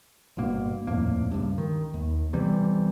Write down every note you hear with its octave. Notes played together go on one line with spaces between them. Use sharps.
G1 G2 B2 A#3
D#1 F2 A2 A#3
C#2 G2
D#3
D#2
B1 C3 E3 G3